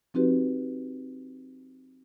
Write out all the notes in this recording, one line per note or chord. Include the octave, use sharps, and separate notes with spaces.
F3 C4 D#4 F#4 G4 B4